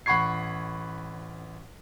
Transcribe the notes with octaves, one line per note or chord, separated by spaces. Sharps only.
A1 F#5 B5 C#6 G#6 C7